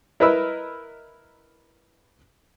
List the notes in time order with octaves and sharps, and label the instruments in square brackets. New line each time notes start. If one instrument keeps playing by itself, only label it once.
[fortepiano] E4 A#4 B4 D#5 B5 E6